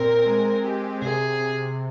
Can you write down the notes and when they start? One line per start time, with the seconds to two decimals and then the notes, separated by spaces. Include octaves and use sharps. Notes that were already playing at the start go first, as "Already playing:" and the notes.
Already playing: A#2 C4 A#4
0.26 G#3
0.64 G4
1.02 C3 G#4
1.40 C3